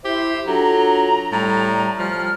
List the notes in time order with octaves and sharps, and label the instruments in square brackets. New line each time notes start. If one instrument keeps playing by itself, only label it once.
[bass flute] E4 [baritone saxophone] G4 [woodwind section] C5 E5
[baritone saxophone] F#3 [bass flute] D4 [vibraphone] F4 A4 C#5 [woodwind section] A#5
[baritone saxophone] A2 [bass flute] G3 [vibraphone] G5
[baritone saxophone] F3 [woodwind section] F6